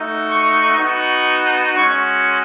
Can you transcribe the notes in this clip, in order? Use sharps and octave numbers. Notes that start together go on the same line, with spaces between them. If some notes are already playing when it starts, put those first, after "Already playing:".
Already playing: A3 D#4 F#4
C#6
B3 D#4 F#4
G#3 C#4 F#4 C#6